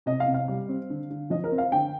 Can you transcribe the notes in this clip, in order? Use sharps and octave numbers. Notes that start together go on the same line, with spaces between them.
C3 D#5
F5
C3
F5
G3
C4
D3
D3
F3 D#5
A#4
C4
F5
D3 G5